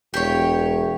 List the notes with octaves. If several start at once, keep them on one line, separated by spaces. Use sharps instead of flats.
E1 G4 C#5